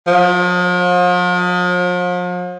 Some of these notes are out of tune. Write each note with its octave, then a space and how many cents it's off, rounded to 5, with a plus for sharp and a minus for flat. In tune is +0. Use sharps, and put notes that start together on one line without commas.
F3 +40